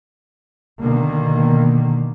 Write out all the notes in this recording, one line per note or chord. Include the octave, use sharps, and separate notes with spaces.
B2 D3 D#3 A#3